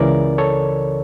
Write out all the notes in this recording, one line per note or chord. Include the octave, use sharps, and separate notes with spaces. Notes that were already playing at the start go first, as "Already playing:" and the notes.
Already playing: C#2 C#3 E3 A#4 D5
A4 C#5